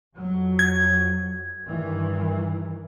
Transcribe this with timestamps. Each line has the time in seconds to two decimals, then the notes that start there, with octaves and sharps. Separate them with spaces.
0.16 F2 F#3
0.59 G#6
1.66 G2 D#3 E3